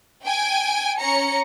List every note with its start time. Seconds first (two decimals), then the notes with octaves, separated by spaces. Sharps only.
0.25 G5 G#5 D7
0.99 C#4 A#5 C#7